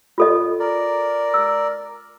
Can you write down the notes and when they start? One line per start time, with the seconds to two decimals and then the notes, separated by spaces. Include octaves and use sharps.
0.18 F4 A4 D#5
0.59 A#4 D5
1.34 E6